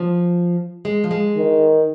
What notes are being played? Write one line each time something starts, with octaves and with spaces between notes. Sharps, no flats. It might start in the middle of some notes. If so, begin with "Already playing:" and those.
Already playing: F3
G#3
F3
G#3
D#3